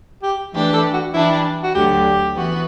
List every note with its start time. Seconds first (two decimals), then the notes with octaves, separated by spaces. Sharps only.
0.23 G4
0.53 E3 A3 D4 G4 B4
0.73 A4
0.93 F#4
1.14 E3 G3 D4 E4
1.63 F#4
1.75 D2 D3 F#3 G4
2.35 E3 B3 F#4